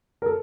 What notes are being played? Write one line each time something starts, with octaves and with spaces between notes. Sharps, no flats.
A#4
A4